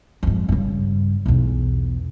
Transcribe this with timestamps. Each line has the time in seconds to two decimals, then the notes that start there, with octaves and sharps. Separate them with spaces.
0.23 F2 G#2
0.49 G2 C#3
1.26 B1 E2